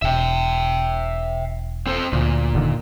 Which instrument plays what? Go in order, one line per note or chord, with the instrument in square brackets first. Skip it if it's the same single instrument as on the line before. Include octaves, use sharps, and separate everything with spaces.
[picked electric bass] E1 [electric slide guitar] E5 G5
[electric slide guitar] C4 A4 C5
[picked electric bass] D2 [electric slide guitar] A#2
[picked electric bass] F1 D3 D#3